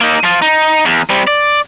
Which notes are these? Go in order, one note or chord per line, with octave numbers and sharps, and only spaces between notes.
A#3 D#4
F3 F4
D#4
E2
G3 C4
D5